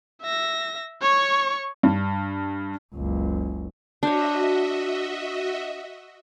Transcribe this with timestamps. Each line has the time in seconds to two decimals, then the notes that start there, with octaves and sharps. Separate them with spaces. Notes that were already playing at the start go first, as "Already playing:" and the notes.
0.22 E5 A#6
1.02 C#5 C#6
1.83 G2
2.95 F#1 C#2
4.03 D4 F#4 C5 C#5 D#5 E5